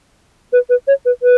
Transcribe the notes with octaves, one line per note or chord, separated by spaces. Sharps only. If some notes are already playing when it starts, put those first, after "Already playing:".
B4
B4
C#5
B4
B4